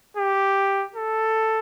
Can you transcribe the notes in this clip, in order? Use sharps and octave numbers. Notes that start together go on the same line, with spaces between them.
G4
A4